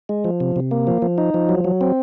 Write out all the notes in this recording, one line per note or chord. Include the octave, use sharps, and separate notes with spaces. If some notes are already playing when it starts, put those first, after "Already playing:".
G#3
F3
C3
C3
A#3
F3
F3
D#4
F3
F#3
F#3
C4